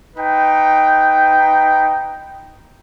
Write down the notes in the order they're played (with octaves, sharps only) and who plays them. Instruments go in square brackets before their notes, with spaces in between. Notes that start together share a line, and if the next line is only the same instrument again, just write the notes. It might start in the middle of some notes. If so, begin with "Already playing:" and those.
[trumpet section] D#4 B4 G5